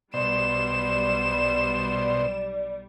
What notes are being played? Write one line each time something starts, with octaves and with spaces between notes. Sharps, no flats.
B1 B2 G3 C5 D5 E7